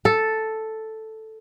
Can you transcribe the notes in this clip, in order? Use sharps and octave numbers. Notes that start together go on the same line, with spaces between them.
A4